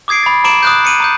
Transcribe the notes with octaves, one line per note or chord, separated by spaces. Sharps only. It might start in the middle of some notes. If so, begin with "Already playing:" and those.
D6 D#6 G#6 C7 D7
B5 A6
A#5 B5 D6 D7 E7 F#7
D#6 F#6 G6
C#7 D#7 F#7
A#5 D#6 G6